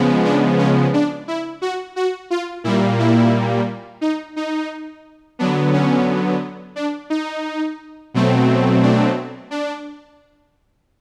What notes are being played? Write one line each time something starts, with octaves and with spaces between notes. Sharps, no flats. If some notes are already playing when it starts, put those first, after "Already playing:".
Already playing: C#3 F3 G#3 B3
D4
C#4
D4
E4
F#4
F#4
F4
A#2 G3 A#3 E4
E4
D#4
D#4
D3 F#3 B3 D4
C#4
D4
D#4
B2 F#3 A3 C4
D4
D4